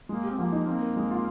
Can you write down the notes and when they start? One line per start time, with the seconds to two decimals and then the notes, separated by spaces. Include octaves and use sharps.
0.09 G#3 A#3
0.24 G4
0.30 C4
0.37 F3 A#3
0.52 D#4
0.67 A#3 C4
0.82 A#4
0.96 G#3
1.11 F4